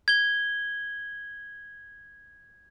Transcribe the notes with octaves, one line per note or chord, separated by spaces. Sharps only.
G#6 G7